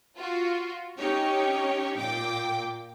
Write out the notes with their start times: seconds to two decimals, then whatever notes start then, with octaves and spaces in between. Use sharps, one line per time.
0.18 F4 F#4
0.98 C#4 D#4 G4 C#5
1.98 A#2 G5 D6